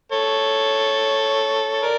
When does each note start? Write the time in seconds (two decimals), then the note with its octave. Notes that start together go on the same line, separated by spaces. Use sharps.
0.12 A4 C#5
1.82 A#4 D5